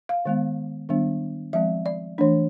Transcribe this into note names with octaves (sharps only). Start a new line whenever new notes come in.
F5
D#3 G#3 B3
D#3 G3 B3 D4
F3 G#3 C4 E5
D5
E3 A3 D4